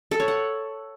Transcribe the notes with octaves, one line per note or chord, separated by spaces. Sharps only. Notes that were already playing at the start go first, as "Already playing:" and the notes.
A4
C#5
F#5